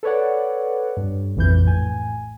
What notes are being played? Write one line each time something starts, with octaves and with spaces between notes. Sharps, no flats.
A4 B4 C#5 D5 F#5
G2
A#1 F2 E3 B4 G6
A2 G#5